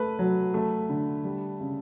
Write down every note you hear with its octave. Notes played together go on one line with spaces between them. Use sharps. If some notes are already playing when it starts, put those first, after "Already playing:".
Already playing: A3 B4
F#3
A3
D3
G3
C#3